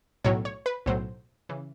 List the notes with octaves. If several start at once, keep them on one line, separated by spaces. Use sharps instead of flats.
B1 A2 F#3 C#5
C#5
B4
B1 A2 F#3 C5
C#3 E3